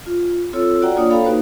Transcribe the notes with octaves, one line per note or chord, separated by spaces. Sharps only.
F4
C4 F4 A4 C#5 E6
F#4 D5 F#5 G5 A#5
A#3 D4 F4 C#5 D5 D#6
A4 C#5 F5 G5 A#5 B5
A#3 D#4 F#4 B4 C5